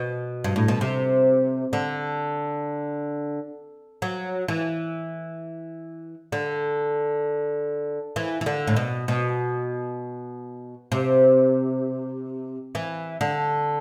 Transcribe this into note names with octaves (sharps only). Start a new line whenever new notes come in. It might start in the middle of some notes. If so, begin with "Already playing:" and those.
Already playing: B2
G2
A2
B2
C3
D3
F#3
E3
D3
E3
E3
D3
A2
B2
B2
C3
E3
D3